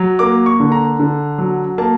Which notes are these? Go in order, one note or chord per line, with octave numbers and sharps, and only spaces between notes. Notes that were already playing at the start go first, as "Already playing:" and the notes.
Already playing: F#3
A#3 D6
C#6
D3
A#5
D3
F#3
A#3 A5